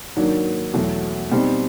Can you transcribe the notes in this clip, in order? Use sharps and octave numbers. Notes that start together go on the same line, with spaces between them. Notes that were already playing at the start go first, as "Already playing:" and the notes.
G#2 D#3 F#3 A#3 D4
E2 B2 F#3 A3
B2 G3 C4 D#4